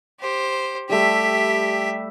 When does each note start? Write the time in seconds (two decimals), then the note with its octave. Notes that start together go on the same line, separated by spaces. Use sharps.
0.20 G4 C5
0.89 G3 A3 G4 E5